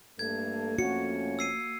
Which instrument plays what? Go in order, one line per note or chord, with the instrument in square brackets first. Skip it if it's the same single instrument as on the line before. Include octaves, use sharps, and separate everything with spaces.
[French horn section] G2 A3 A4 [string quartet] A#3 [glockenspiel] G#6
[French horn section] F2 A3 C#4 [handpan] F#4 [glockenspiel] C#7
[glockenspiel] E6 C7 D#7